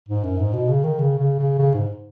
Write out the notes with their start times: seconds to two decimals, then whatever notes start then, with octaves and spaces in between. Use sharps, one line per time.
0.08 G#2
0.24 F#2
0.39 G#2
0.53 B2
0.69 C#3
0.84 D#3
0.99 C#3
1.19 C#3
1.39 C#3
1.59 C#3
1.74 G#2